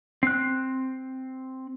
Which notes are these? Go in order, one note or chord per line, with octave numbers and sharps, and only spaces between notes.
C4 F#6